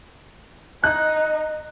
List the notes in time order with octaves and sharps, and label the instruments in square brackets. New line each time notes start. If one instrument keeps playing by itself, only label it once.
[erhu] D#4 [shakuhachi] D#5 [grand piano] F#6